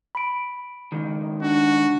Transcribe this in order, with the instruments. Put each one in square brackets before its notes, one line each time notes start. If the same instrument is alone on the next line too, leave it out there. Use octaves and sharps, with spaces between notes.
[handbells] B5 D7
[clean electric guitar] C#2 D#3
[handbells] D4 [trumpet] F#4